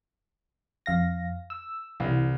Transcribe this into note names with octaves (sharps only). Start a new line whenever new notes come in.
F2 F5 A#6
E6
C2 E3